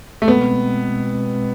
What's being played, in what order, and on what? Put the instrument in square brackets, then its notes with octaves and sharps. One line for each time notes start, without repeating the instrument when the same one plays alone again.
[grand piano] A3
[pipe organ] B2 G#3 C4 [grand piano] B3